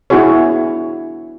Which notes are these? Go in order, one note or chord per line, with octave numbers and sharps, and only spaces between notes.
B3 D4 E4 F#4 G#4 C#5